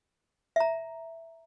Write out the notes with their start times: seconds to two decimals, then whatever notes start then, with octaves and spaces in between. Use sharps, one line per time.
0.56 E5 A#5